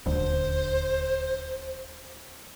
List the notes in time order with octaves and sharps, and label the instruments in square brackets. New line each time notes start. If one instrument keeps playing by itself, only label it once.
[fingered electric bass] D#1 D2 D3 [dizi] C5